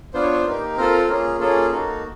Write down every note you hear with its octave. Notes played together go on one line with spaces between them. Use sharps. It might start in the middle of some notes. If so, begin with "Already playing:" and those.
B3 D4 F4 C5
C#5
C5
A#3 D#4 G4
C4 F4 A4 A#4
A#3 C#4 F4 G#4
A#3 C#4 F4 G#4 A4
A#3 D#4 F#4 A4